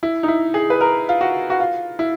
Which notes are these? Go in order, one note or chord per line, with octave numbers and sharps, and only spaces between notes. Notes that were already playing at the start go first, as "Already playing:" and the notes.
E4
D#4
E4
G#4
B4
A#4
F4
F#4
F#4
F4
E4